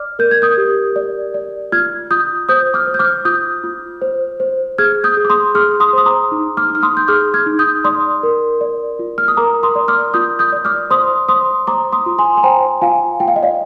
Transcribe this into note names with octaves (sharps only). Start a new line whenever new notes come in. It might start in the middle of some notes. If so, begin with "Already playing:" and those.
Already playing: D5 D6 F6
A#4 G6
G#6
D#6 G6
G4
D5
D5
F4 F6 G#6
F4 D#6 G6
C5 D#6 G6
D6 F6
C5
G6
D6 F6
F4 D#6 G6
F4
C5
C5
G#4 F6 G#6
D#6 G6
G#4
D6
C6 D#6
G#4 D6 F6
C6 D#6
C5 D#6
A#5 D6
D#4
D6 F6
D#4
F6
C6 D#6
G6
G#4 D6 F6
F6 G#6
D#4
D#6 G6
D5 C6 D#6
A#4
D5
F4
F6
D#6
A#4 A#5 D6
C6 D#6
D5
D6 F6
F4 D#6 G6
D#6 G6
D5
D6 F6
C5 C6 D#6
C5 C6 D#6
C5 A#5 D6
C6 D#6
F4
G#5 C6
G#5
C5 G5 A#5
F4 F5 G#5
F4 G5
F5
D#5
D5 F5